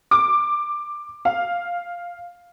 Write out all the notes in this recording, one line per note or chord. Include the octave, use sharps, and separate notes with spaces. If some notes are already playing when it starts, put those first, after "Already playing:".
D6
F5